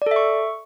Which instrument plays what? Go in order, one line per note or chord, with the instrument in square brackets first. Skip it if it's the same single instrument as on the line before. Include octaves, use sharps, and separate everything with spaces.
[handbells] D5
A4
E5
C#6